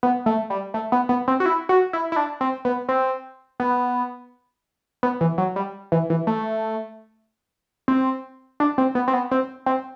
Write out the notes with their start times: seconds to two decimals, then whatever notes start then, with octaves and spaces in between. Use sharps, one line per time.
0.03 B3
0.26 A3
0.50 G3
0.74 A3
0.92 B3
1.09 B3
1.28 C4
1.40 F#4
1.46 E4
1.69 F#4
1.93 E4
2.12 E4
2.16 D4
2.41 C4
2.65 B3
2.89 C4
3.60 B3
5.03 B3
5.21 E3
5.38 F#3
5.56 G3
5.92 E3
6.10 E3
6.27 A3
7.88 C4
8.60 D4
8.78 C4
8.95 B3
9.08 C4
9.13 B3
9.31 C4
9.66 C4